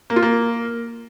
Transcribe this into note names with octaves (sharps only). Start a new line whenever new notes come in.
A#3
F4
A#3